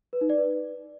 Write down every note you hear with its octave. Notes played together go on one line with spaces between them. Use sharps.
B4
D#4
D5
B4